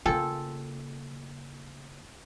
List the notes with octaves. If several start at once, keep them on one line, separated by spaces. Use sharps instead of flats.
C#3 A#3 F4 A4 G5 G#5